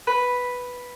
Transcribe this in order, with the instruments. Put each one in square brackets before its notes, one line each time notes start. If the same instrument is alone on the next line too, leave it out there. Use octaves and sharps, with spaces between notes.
[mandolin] B4